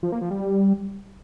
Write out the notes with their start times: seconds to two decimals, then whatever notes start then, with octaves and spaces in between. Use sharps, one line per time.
0.03 F3
0.12 A#3
0.21 F3
0.31 G3